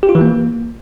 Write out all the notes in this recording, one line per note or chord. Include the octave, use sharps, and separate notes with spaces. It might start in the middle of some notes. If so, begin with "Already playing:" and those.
G4
F4
E3
A#3